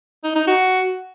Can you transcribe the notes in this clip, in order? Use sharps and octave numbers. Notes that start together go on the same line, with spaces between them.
D#4
D#4
F#4